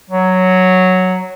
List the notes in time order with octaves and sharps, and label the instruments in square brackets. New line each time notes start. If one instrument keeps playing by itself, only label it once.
[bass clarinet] F#3